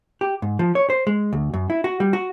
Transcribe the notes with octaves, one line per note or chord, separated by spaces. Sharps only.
G4
G#2
F3
C#5
C5
G#3
D2
F#2
E4
F#4
G3
F#4